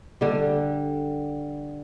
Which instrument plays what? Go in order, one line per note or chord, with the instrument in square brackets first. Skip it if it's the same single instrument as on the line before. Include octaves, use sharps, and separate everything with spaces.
[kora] D3 G3